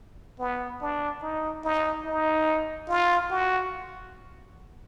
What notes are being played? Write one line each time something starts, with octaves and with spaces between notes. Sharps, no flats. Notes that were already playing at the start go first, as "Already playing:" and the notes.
B3
D4
D#4
D#4
D#4
F4
F#4